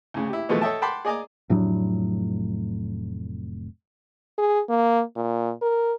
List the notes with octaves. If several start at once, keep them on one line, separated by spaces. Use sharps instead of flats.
D2 C#3
E4 G4
B2 E3 F3 G#3 A3 A4
A4 C#5 D#5 E5 G5 A5
F#5 G5 A5 B5 C6 D6
G#4 D5 D#5 G#5 A#5 D6
F1 A2 F#3 D4
G#4
A#3
A#2
A#4